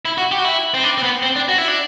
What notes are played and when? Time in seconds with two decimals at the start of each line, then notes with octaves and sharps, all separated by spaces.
0.05 E4
0.18 F#4
0.32 G4
0.39 F#4
0.44 E4
0.74 C4
0.84 D4
0.98 C4
1.03 B3
1.22 C4
1.36 D4
1.49 F#4
1.58 E4
1.68 D4